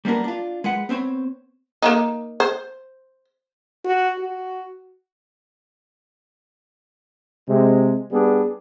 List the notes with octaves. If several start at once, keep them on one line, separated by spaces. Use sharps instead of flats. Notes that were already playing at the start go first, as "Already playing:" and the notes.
G3 A#3 B3 D4 A#4
D4 F4
G#3 B4 F#5
B3 C4 C5 C#5
A#3 D4 D#4
C5
F#4
F#4
C3 G#3
G3 B3 D4 G#4